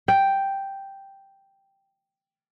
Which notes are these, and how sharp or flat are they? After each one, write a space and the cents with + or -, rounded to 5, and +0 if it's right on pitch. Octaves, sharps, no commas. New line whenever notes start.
G5 +0